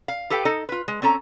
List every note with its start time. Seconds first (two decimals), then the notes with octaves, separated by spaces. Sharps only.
0.08 F5
0.30 G4 A4 B4 F5 G5
0.45 D#4 A4 D#5
0.69 F4 B4
0.88 G#3
1.02 C4 C#4 A4 A#5